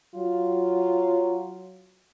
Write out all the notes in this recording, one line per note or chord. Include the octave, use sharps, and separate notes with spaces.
F#3 F4